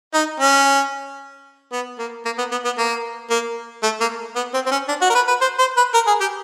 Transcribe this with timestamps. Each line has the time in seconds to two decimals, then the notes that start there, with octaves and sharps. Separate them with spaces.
0.14 D#4
0.40 C#4
1.72 B3
1.99 A#3
2.25 A#3
2.38 B3
2.51 B3
2.65 B3
2.78 A#3
3.30 A#3
3.83 A3
4.00 A#3
4.36 B3
4.54 C4
4.66 C4
4.71 C#4
4.88 D4
5.01 F#4
5.10 A#4
5.15 B4
5.28 B4
5.41 C5
5.59 C5
5.77 B4
5.94 A#4
6.07 G#4
6.21 G4